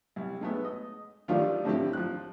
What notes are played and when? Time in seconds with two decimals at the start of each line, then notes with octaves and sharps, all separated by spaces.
0.16 C2
0.41 G#3 A3 B3
0.65 D#5
1.28 D#3 F3 G3 A3 D4 F4
1.65 A2 D3 F3 C4 E4 G4
1.93 F3 F#6